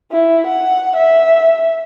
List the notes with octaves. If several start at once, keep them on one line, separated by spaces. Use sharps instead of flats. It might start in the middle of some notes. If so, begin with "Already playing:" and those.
E4
F#5
E5